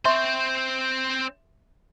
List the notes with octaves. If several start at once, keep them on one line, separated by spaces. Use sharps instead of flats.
C4 C5 E5 C6 C#6